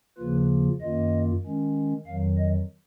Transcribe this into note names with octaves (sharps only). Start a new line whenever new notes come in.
D#2 C#3 F3 A#3 F4 B4
F#2 D#3 A#3 F4 D#5
D#3 G#3 C#4
F2 D#3 F#3 F5
D#5